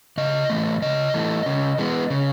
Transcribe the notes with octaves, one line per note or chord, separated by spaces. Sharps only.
C#3 D#5
E3 A3
C#3 D#5
E3 A3
C#3
E3 G#3 B3
C#3